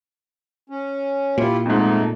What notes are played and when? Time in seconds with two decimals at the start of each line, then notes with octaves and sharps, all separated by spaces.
0.70 C#4
1.38 A#2 E4 F4 G4
1.66 F2 G#2 A3 D#4